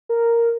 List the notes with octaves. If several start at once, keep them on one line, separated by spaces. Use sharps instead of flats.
A#4